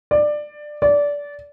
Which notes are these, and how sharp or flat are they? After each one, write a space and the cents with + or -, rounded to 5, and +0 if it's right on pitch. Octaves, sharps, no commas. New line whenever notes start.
D5 +15
D5 -20